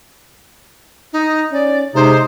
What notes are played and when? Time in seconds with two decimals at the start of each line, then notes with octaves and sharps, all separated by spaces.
1.13 D#4
1.53 C#4 D5
1.95 C3 G#3 D#4 C5